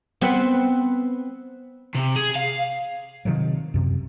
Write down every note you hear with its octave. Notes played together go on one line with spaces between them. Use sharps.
B3 C4 B4
C3
G#4
F5
C3 D#3 F3 F#3
F#2 C3